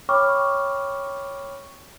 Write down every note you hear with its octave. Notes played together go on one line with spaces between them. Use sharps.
C#5 G5 B5 C#6 D6 F6